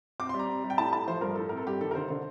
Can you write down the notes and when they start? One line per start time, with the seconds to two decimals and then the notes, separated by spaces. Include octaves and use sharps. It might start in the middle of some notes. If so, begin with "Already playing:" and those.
0.20 C4 D6
0.29 C6
0.34 G3
0.39 A#5
0.49 C4
0.64 G3
0.70 G5
0.78 A2 A5
0.93 A2 A5
1.08 F3 C5
1.21 G2 A#4
1.36 A2 A4
1.49 C4 A#4
1.57 A4
1.66 G2 G4
1.81 D#3 A4
1.91 A#4
1.95 D3 C5
2.10 D3